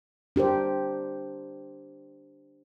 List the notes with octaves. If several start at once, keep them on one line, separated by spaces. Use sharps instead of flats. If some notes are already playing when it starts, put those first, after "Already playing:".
D4 G4 A#4 C5